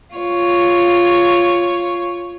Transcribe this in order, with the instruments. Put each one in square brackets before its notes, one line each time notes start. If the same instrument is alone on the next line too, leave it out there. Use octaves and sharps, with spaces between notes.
[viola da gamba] F4 C#5